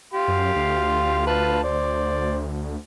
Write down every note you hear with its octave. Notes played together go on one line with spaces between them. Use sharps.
G4 F5 C6
F#2
D2
F4 B4 A5
C5 D5